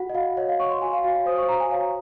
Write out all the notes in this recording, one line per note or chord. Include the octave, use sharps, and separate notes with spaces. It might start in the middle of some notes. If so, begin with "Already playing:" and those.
Already playing: F#4 F#5
D#5
F#4 F5
C#5 D#5
F5
C#5 C#6
C6
F#4 G#5
F5
F#4 F5
F5
C5 D#6
C#6
F#4 A#5
G#5
C#5 F5